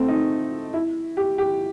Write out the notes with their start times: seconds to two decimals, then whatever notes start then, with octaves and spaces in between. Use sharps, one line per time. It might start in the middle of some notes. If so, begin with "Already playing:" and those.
Already playing: A3 C4
0.08 D#4
0.73 E4
1.17 G4
1.38 G4